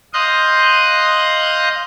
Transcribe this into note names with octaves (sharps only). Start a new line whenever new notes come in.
D#5 F5 C6 D#6 F#6 G6